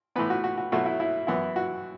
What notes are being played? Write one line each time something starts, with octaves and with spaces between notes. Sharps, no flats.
A2 E3 B3 B4
F#4
F#4
F#4
B2 F#3 A3 F#4
E4
E4
F#2 E3 B3 E4
F#4